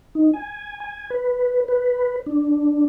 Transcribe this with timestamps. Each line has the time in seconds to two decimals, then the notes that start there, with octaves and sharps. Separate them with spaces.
0.15 D#4
0.33 G#5
0.80 G#5
1.10 B4
1.68 B4
2.26 D4